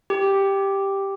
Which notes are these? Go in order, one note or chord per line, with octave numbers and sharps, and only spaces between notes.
G4